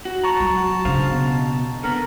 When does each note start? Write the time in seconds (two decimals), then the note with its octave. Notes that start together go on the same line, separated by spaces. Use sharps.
0.05 F#4
0.24 A5 A#5 C#6
0.40 F#3
0.85 C#3 D4 C5 F5
1.10 B2
1.83 D3 B3 A#4